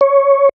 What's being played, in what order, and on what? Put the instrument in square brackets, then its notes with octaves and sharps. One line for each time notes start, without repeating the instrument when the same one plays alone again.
[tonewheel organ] C#5